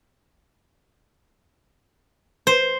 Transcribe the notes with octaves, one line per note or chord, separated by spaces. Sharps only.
C5